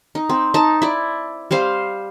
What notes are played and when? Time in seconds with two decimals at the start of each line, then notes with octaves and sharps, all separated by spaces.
0.15 D#4
0.29 C4
0.54 D#4 A5
0.82 E4 D5
1.51 G3 C4 C5 F5